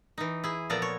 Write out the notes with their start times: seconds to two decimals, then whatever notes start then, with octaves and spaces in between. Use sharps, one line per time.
0.18 E3 D#4
0.44 E4 G#4
0.70 A#2 F3 B3 A4 D5 A#5
0.82 C#5